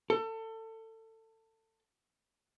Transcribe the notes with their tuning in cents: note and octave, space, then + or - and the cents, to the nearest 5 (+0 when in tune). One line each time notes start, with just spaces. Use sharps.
A4 +25